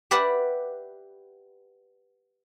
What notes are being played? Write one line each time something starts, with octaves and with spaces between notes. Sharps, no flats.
G4 B4 D5 E5 F#5